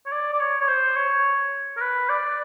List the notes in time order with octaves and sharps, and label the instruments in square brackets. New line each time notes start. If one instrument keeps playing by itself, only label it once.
[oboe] C#5
D5
D5
C#5
C#5
C5
C#5
A#4
B4
D5